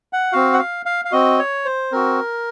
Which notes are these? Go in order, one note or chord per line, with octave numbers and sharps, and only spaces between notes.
F#5
C4 F#4 F5
F#5
F5
F5
F5
C4 F#4 D#5
C#5
C5
C4 F#4 A#4